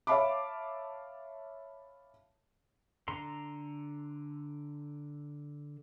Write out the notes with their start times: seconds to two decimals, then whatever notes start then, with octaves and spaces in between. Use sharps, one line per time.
0.07 C#5 E5 F5 A5 B5 D6
3.08 D3 A4 A#5 C6